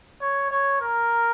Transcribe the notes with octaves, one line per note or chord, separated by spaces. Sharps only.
C#5
C#5
A#4